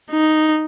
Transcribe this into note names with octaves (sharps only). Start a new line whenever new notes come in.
D#4